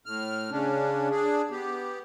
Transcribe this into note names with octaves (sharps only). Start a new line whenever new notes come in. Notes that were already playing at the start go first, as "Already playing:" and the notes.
A2 F6
C#3 C#4 D4
D4 G#4
B3 G4